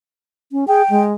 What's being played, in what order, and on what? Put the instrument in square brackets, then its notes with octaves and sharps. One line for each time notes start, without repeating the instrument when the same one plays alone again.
[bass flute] C#4
[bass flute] G#4 [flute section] G5
[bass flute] G#3